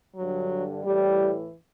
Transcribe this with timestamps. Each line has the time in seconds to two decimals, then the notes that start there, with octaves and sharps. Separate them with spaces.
0.16 G2 D3 F#3
0.85 A2 E3 G3